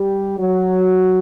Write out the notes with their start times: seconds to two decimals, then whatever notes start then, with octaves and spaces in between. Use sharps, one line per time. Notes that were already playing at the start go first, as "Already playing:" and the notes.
Already playing: G3 G4
0.39 F#3 F#4